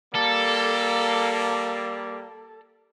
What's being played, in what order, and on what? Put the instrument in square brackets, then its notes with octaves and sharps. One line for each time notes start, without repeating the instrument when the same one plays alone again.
[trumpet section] G3 A#3 [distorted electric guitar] A4